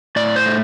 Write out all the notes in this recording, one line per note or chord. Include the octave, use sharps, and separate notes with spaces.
A2 D5
C5
A3